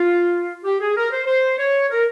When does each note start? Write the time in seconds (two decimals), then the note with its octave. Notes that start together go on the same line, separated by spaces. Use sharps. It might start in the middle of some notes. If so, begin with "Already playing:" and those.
Already playing: F4
0.64 G4
0.80 G#4
0.96 A#4
1.12 C5
1.26 C5
1.58 C#5
1.90 A#4